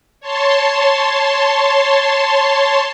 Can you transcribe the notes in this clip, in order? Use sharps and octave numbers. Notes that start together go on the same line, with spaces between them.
C#5 A5 C6